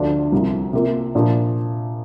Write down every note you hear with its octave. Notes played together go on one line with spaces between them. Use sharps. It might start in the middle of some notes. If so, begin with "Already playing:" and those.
Already playing: D2 D3 F3 D4
C2 C3 F3
C3 A#3 F4
A#2 F3 D4